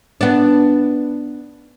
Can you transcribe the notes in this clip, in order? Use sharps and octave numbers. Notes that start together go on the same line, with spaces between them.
B3 D4